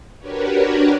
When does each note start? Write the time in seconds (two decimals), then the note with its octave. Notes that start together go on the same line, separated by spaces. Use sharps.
0.19 D4 F#4 G4 A#4 B4 C#5